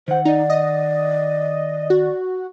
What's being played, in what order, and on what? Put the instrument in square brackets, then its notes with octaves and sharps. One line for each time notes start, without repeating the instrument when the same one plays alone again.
[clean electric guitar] D#3 F#5 [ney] C5
[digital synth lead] D#4 [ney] D5
[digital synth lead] D#5
F#4